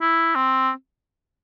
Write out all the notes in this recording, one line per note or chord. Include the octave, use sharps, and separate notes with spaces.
E4
C4